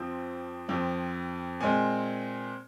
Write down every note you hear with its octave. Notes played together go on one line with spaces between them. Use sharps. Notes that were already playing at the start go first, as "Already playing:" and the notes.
Already playing: F2 F3 C4
F2 F3 C4
A#2 G#3 C4 G#5